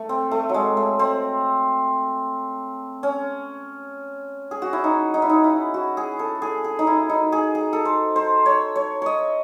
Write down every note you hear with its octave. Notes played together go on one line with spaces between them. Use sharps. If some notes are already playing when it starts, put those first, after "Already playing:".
Already playing: A3
C4
A3
F#3 G#3
A3
C4
C#4
G#4
F#4
E4
D#4
D#4
E4
D#4
E4
F#4
G#4
A4
G#4
G#4
D#4
E4
D#4
G#4
G#4
A4
C5
C5
C#5
C#5
C#5 D#5